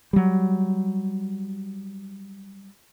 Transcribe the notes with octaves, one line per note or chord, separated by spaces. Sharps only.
F#3 G3